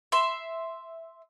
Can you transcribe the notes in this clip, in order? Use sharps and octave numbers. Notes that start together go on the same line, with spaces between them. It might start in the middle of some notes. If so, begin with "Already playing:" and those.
E5 C6